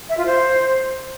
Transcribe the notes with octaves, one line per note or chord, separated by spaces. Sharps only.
E5
F4
C5